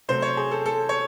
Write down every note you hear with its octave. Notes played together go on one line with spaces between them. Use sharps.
C3 F#3 A3 C5
C#5
G#4
A4
A4
C#5